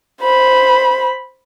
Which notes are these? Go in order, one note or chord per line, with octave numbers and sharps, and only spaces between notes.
C5 B5